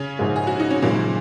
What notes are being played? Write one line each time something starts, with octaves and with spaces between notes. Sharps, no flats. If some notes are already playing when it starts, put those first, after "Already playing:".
Already playing: C#3 C#4
A#1 G#2 G#3
G#4
F#4
D#4
C#4
F#1 F#2 A#2 D#3 G#3 A#3 D#4